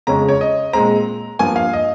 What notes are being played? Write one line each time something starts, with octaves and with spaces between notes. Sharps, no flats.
F2 C#3 G#3 C#4 A#5
C#5
D#5
A#2 G#3 C4 A#5
G2 F3 A#3 G#5
F5
D#5